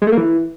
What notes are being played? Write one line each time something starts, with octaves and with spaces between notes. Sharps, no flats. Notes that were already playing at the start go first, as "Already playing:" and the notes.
G#3
A3
A#3
E3